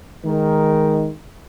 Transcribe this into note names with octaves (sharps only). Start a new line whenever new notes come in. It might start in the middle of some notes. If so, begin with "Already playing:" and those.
D#3 G#3 D#4 A#4